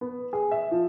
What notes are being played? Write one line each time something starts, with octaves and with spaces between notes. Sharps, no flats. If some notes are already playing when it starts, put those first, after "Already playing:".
B3
G#4
E5
F3